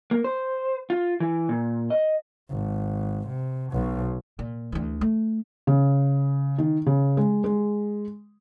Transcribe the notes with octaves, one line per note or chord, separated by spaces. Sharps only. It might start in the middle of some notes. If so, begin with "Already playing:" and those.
A#3
C5
F4
E3
A#2
D#5
G#1
C3
B1 B2
A#2
D2 E3
A3
C#3
D#3
C#3
G#3
G#3